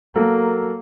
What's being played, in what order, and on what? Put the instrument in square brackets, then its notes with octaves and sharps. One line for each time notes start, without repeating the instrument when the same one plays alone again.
[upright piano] F#3 A4 A#4 [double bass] A#3